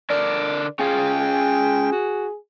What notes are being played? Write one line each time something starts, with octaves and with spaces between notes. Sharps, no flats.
D3 D4 A#4 D5
C#4 F4 G#4 F5 G5
G#4
F#4